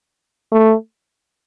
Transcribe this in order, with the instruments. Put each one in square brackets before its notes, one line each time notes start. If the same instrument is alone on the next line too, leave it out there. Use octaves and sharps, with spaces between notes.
[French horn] A3